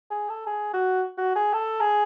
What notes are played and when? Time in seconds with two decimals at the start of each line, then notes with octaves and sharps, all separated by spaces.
0.11 G#4
0.29 A4
0.46 G#4
0.73 F#4
1.18 F#4
1.36 G#4
1.53 A4
1.81 G#4